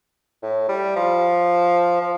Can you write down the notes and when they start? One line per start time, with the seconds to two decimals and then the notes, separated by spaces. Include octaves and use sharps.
0.43 A2
0.69 G3
0.96 F3
2.01 F3